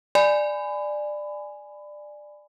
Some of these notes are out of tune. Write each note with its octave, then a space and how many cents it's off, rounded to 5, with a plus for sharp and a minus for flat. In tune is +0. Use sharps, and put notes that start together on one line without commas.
D5 +15 G#5 +0 B5 +25